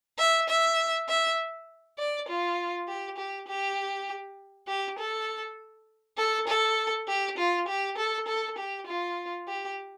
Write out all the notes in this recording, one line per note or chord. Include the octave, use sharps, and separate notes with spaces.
E5
E5
E5
D5
F4
G4
G4
G4
G4
A4
A4
A4
G4
F4
G4
A4
A4
G4
F4
G4